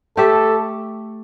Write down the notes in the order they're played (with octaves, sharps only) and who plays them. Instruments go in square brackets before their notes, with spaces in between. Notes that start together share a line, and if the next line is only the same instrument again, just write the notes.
[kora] A3 G4 E5 [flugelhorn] A4